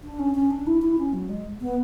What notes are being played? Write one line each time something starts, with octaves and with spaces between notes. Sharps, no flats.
D4
C#4
C#4
D4
E4
E4
C#4
F#3
G#3
B3